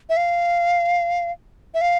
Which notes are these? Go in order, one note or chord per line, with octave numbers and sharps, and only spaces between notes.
E5
F5
E5
F5